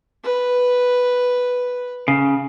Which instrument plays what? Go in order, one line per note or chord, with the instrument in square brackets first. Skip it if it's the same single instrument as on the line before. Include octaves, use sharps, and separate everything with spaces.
[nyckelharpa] B4
[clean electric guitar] C#3